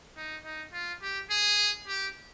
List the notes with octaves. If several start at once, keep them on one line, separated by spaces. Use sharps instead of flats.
D#4
D#4
F4
G4
G#4
G4